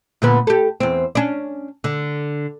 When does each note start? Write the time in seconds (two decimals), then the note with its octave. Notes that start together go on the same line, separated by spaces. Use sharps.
0.22 A#2 D3 B3
0.47 G4 A4
0.80 E2 C4
1.15 C#4 D4
1.84 D3